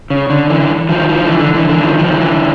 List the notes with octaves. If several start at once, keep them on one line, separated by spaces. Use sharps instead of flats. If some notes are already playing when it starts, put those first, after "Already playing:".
C#3
D3
D3 E3
D#3 F3
D#3 F3
D3 E3
D3
D3 E3
D3 E3
D#3 F3
D#3 F3
D3 E3